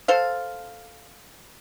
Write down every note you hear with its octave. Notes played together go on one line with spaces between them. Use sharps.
A4 C5 F5